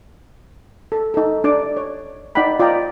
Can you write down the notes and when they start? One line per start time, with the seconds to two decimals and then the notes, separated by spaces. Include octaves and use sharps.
0.92 A4
1.14 D#4 A4
1.44 D4 D5 D6
1.77 C#5
2.35 D#4 D5 F#5 G5 B5
2.60 F4 D5 D#5 G5 A#5